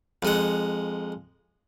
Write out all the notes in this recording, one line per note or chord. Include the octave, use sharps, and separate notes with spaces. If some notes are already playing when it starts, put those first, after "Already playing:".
F2 G#3 F#5